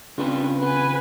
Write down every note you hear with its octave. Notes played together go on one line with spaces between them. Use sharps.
C2 C#3 C4 D4 F4 B4
B3 B4 G#5